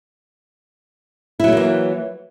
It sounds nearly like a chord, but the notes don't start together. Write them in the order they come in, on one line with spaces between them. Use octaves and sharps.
E4 F#3 A3 A#3 E3